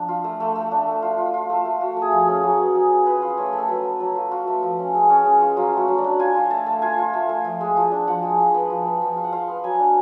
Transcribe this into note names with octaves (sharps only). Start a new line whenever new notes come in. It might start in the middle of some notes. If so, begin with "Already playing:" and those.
Already playing: F3 D4
F4
A3
A3
A3
D4
A3
F4
F4
F4
A3
A3
F4 F#4
A3
G#4
F3
G#4
C#4
F#3 F#4
B3
F#3 G#4
F4
F4 B4
F4
A3 C#5
A3
A4
F#3 B4
B3
F#3 A4
F4
F4 F#4
A3
F3
C#4
G#3
C#4
G#3
F4
F#3 F4
A3
F#4
F#3
D5
D4
F4 G#5
F4
A3 A5
A3
F4 G#5
F4
A3
A3
F3
G#3
F3
D4
F3 F#5
G#3
F3
B3
F3
B3
F3
F4
F#5
F4 F5
B3
F#3 G#5
D4